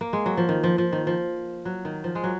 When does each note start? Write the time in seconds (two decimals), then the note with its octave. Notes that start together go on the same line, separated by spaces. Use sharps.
0.01 A#3
0.13 G#3
0.26 F#3
0.37 F3
0.49 D#3
0.63 F3
0.78 F3
0.92 D#3
1.07 F3
1.65 F#3
1.85 D#3
2.04 F3
2.15 G#3
2.24 F#3